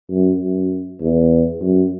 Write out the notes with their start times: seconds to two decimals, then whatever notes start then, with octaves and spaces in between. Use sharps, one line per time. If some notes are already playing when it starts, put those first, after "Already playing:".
0.10 F#2
0.41 F#2
1.01 E2
1.62 F#2